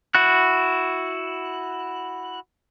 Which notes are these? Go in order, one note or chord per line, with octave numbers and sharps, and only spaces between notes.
E4 F#4 F#6